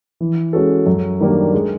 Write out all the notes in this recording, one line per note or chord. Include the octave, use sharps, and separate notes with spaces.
E3
G#3 C#4 F#4 A4
F#2
D#3 G3 A#3 D4
G#3